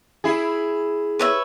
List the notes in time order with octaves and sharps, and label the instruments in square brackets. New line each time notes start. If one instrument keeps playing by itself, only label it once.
[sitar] E4 G#4
[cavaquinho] B4 C#5 E5